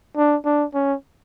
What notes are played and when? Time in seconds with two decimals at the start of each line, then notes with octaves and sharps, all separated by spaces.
0.16 D4
0.45 D4
0.74 C#4